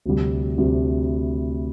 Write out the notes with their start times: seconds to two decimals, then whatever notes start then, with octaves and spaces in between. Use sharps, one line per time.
0.06 D2 C3 G3
0.58 D2 C3 G3